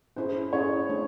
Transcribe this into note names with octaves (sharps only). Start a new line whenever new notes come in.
C#4 E4 G#4 C5
C#4 E4 G#4 C#5
A3 D4